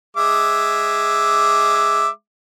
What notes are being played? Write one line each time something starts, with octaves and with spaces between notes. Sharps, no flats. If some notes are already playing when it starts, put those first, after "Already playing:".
G#3 E5 D6